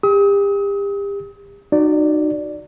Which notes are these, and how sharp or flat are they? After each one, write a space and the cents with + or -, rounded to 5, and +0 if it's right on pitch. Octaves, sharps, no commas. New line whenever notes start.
G4 +35 D#6 +40
D#4 -30 F#4 +0 D5 +0